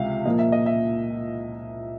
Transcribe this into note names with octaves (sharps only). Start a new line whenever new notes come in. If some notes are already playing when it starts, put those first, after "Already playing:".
Already playing: C#2 C3 E5 F5
A#2 F3 A#3 D#5
E5
D#5
E5